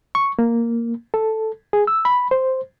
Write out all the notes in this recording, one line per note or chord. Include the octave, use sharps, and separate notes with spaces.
C#6
A#3
A4
G#4
E6
B5
C5